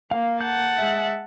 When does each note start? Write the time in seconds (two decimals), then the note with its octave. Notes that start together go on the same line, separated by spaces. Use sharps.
0.11 A#3 F5
0.41 F#5 A5 G6
0.77 G#3 E5